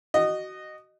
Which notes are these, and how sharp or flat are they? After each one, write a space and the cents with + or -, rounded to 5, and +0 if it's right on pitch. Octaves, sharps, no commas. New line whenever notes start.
F#4 +20 D#5 -15